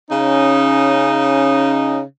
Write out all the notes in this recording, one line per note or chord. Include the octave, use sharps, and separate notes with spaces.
C#3 C#4 D#4